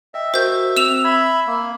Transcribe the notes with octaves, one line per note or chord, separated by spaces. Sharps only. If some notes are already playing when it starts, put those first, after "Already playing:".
D#5 E5 G5
F#4 A#4 C5 G6
C4 E6 E7 F7
E5 B5 G#6
A#3